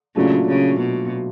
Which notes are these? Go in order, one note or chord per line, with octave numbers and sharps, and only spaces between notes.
A#2 C#3 F#3 A3 D4
C#3
B2